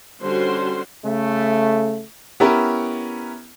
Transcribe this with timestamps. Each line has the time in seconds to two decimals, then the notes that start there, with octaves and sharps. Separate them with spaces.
0.21 D3 G3 C#4 F#4 C5 C6
1.04 C#3 A3
2.40 B3 C#4 E4 G4 A#4